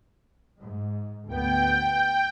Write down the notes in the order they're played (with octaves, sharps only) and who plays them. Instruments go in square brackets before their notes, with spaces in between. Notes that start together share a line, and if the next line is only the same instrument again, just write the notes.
[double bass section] G#2
[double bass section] D2 B3 [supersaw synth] G5